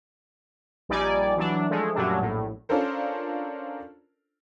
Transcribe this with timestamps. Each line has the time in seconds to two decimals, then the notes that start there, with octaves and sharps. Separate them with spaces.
0.89 A#1 G3 D#4 D5 G#5
1.37 E3 F#3 D4
1.70 F3 G#3 A3
1.95 F#2 A#2 F#3 G3 A3 D4
2.21 A#1 A2
2.69 C#4 D4 F4 A4 A#4 C5